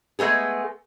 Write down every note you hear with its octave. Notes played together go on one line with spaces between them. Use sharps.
G#3 A3 B3 G#4